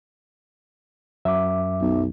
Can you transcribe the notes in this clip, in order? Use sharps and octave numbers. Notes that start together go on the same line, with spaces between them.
F#2 E5 D6
B1